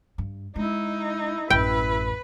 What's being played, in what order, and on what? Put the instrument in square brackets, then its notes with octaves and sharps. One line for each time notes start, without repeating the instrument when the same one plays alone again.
[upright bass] G2
[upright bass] G#3 [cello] D#4 [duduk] E4
[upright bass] A1 F#2 [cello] B4 [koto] G5